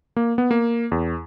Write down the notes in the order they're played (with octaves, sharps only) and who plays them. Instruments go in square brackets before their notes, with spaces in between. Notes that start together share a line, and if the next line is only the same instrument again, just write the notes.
[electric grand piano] A#3
B3
A#3
E2